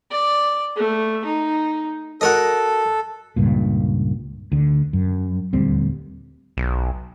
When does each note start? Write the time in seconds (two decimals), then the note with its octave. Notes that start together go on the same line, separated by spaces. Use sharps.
0.11 D5
0.76 A3
1.25 D#4
2.21 F#4 A4 A#4 D#5
3.36 C#2 G2 A#2
4.52 D2 D3
4.93 F#2
5.53 D#1 D2 G3 C4
6.57 B1